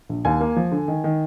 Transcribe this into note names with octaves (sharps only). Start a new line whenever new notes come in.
A#1
D#2 G#5
A#3
F3
D3
D#3
D#3